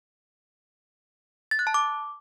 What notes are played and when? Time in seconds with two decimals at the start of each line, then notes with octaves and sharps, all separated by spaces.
1.51 A6
1.59 F#6
1.67 A5
1.74 D6